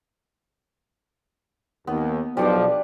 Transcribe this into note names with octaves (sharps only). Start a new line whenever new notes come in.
D#2 B3
B1 B2 F3 G3 D4 D5